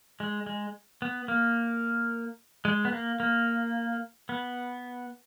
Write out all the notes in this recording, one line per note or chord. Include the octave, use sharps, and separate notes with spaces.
G#3
G#3
B3
A#3
G#3
B3
A#3
A#3
B3